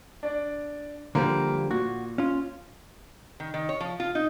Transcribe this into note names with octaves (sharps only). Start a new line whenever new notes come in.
D4 D5
D3 F3 G3 A#3 A#5
A#2 F#4
C#4 F4
D#3
D#3
C#5
F3
F4
D#4